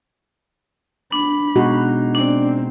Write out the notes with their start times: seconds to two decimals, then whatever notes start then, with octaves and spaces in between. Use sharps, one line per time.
1.12 D4 B5
1.56 B2 G#3 D#4 F#4
2.15 C4 D4 D5